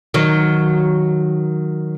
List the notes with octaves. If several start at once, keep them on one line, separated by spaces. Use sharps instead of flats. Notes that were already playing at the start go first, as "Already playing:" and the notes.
D#3 F#3